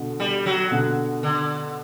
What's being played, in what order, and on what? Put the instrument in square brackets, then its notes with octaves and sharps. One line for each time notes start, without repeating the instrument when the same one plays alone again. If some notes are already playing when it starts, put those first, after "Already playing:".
Already playing: [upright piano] B2 D3
[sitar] G3
F#3
[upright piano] B2 D3
[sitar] D3